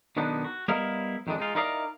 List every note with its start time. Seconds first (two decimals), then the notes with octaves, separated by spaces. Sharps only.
0.17 B1 B2 D#3 B3 D4 D#4
0.44 F#4
0.68 G3 B3 E4 A#4 D#5 F5
1.27 F2 D#3 E3 G#3 D4
1.38 G#3 D#4 F4
1.55 D#4 E4 A#4 D5 D#5 F5